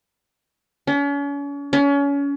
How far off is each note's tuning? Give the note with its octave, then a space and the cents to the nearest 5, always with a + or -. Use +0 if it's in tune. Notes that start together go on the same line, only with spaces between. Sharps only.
C#4 +40
C#4 +30